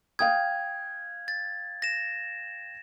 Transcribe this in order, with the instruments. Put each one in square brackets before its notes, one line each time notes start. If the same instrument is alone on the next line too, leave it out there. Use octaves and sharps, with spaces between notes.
[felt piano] F5 G5 D#6 [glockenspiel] G#6
[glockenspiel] A6
A#6 E7